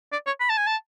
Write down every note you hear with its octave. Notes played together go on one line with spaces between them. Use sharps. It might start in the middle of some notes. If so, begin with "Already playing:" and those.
D5
C#5
B5
A5
G#5
A5